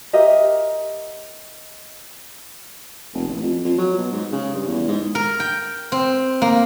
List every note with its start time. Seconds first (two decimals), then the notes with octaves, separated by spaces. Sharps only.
0.13 G4 A#4 D#5 E5
3.14 F1
3.27 A1
3.43 F2
3.65 F2
3.78 F#3
3.98 B2
4.12 G#2
4.32 C#3
4.55 G2
4.68 E2
4.88 G#2
5.15 A#4
5.40 G5
5.92 C4
6.42 A#3